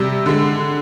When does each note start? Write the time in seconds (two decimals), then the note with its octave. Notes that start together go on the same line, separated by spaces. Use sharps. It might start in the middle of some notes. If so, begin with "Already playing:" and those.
Already playing: C3 G3
0.26 D3 G#3